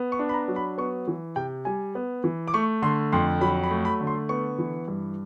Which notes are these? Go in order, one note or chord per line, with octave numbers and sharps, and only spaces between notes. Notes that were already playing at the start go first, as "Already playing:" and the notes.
Already playing: B3
C#6
D4
B5
A#5
F#3
B5
B3 C#6
E3
C3 G5
G3 G#5
B3
E3
D6
A3 C#6
D3 C6
F2 C6
F#3 B5
B5
A3
B5
D3
C6
B3 C#6
E3
G2